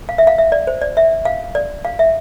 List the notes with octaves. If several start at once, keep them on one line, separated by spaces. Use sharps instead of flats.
F5
E5
F5
E5
D5
C5
D5
E5
F5
D5
F5
E5